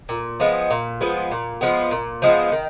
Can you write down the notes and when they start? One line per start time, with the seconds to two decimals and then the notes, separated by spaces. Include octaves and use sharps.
0.09 A#2
0.40 F3 G#3 B3
0.71 A#2
1.01 F3 G#3 B3
1.31 A#2
1.61 F3 G#3 B3
1.91 A#2
2.22 F3 G#3 B3
2.52 D#3